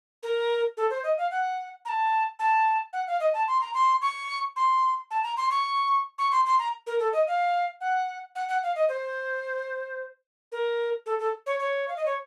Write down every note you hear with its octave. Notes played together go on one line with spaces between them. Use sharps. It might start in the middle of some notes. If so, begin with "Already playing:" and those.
A#4
A4
C5
D#5
F5
F#5
A#5
A5
A5
F#5
F5
D#5
A5
C6
A#5
C6
C#6
C6
A5
A#5
C6
C#6
C#6
C6
C6
A#5
A#4
A4
D#5
F5
F#5
F#5
F#5
F5
D#5
C5
A#4
A4
A4
C#5
C#5
F5
D#5
C#5